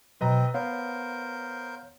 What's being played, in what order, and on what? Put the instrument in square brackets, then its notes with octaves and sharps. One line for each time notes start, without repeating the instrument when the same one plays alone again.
[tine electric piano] B2 F#3 [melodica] C4 [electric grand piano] B4 D#5 A#5
[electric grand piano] B3 [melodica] A#4 C5 [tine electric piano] C#5 F5 F#5